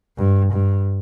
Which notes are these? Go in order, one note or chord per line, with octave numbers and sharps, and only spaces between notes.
G2
G2